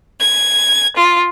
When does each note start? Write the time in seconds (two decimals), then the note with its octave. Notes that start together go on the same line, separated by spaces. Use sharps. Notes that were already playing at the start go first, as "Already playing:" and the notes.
0.19 G#6
0.95 F4